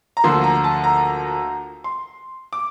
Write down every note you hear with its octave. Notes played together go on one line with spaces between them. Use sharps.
A#5
D2 D3 F3 A#3 C6
A#5
A5
A#5
C6
D6